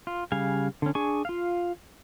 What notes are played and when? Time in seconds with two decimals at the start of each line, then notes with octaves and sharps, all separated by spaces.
0.07 F4
0.32 C#3 G3 F5 G#5
0.82 D3 C#4
0.95 D4 G#4 G#5 C#6
1.25 F4 F5